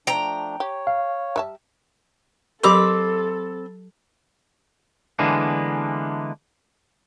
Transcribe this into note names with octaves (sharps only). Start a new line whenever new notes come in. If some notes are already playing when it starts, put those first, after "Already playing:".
F3 A3 D4 G5 A#5
G4 C#5
F5
G3 E5 A5
F#3 C4 G4 A4 A#4 B5 D6
D3 E3 G#3 A#3 B3 D4